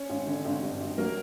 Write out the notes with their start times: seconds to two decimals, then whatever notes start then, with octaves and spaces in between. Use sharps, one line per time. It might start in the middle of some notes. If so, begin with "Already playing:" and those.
Already playing: C#4 C#5
0.10 G#1
0.27 D3
0.45 G#1
0.62 G2
0.81 G#1
0.98 F#3 A#3 A#4